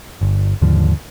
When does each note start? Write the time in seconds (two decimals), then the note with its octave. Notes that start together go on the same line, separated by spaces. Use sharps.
0.21 G1
0.62 D#2 G#2 D3 F3